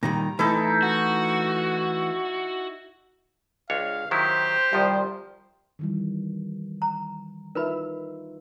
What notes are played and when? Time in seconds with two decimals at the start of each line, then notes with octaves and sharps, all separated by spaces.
0.03 A#2 D#3 G3 A#5
0.39 E3 A3 D#4 E4 A4
0.83 F#4
3.70 C#2 D4 C#5 F5
4.11 D#3 F#3 E4 G4 C5
4.73 C2 D#3 F3 G3
5.79 D#3 E3 G3
6.82 A#5
7.55 D#4 F4 A#4 B4 E5 B5